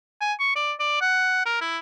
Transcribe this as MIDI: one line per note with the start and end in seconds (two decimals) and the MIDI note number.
0.21 0.33 80
0.40 0.55 85
0.56 0.73 74
0.79 0.98 74
1.01 1.44 78
1.46 1.60 70
1.61 1.78 64